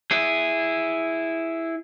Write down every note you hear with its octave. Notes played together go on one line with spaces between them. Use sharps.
E4 G#4